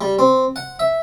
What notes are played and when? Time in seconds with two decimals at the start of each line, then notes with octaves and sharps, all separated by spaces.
0.01 G3
0.19 C4
0.56 F#5
0.79 E5